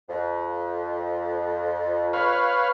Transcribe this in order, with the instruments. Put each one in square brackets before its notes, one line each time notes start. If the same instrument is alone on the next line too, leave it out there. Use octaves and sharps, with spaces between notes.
[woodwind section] F2
[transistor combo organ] B4 C#5 F5